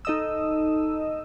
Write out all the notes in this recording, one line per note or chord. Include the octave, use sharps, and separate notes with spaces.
D#4 A4 D#5 D#6 E6